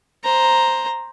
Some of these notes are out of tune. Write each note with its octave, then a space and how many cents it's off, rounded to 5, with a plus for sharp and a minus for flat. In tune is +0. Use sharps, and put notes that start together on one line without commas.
C5 +5 A#5 +0